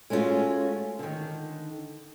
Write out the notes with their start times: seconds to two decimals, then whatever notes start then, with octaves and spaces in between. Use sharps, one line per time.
0.10 G#3 A3 C#4 D4 F4 F#4
0.99 D3 D#3